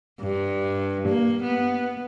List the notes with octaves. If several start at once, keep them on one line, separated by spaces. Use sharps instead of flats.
G2
A#3
B3